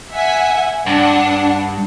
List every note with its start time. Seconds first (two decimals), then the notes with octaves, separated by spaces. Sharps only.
0.12 E5 F#5 G#5
0.87 G2 D4 F#5